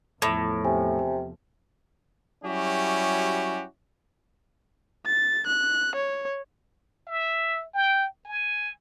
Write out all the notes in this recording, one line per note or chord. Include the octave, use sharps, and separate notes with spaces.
E2 A2 F3 A5 B5
C3 G#5
F#3 G3 C#4 E4 F#4 G4
A6
F#6
C#5
E5
G5
G#5